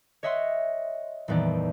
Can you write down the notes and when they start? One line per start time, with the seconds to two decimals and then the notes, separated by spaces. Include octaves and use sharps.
0.23 C#5 D#5 E5 F#5 C6
1.28 D#1 F2 E3 B3 D#4 D5